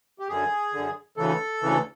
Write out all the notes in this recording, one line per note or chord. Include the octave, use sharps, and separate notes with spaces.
G4
F#2 D3 G#4
F#2 D3
D2 C#3 E3 A4
D2 C#3 E3